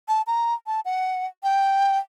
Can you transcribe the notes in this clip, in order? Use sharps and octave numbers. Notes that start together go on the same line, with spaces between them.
A5
A#5
A5
F#5
G5